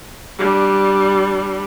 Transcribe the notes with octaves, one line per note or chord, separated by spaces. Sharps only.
G3 D4